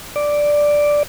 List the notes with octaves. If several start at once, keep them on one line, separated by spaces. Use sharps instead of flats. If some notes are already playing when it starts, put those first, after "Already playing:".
D5